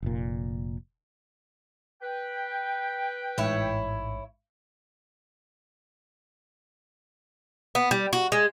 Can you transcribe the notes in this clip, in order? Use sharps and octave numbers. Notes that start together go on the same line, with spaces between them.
F1 A#2
B4 G5
A1 G#2 E4 C#5
B3
G3
F#4
G#3